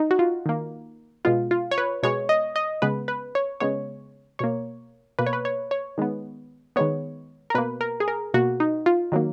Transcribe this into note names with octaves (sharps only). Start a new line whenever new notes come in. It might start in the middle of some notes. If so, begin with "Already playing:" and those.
Already playing: D#4
F#4
F4
D#3 A#3
B2 G#3 B3 F4
F4
C#5
B4
B2 G#3 B3 C#5
D#5
D#5
C#3 G#3 B3 B4
B4
C#5
C#3 G#3 B3 C#5
B2 A#3 C#5
B2 A#3 B4
C#5
B4
C#5
C#5
D#3 G#3 B3
D#3 G#3 B3 C#5
A#4
B2 A#3 B4
A#4
G#4
A#4
B2 A#3 F#4
D#4
F4
D#3 F#3 A#3